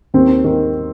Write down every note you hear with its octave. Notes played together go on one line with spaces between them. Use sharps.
D#2 C4
D#3